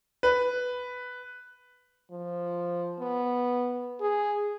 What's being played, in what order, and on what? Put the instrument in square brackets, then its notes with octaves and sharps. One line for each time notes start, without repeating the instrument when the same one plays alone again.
[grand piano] B4
[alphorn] F3
B3
G#4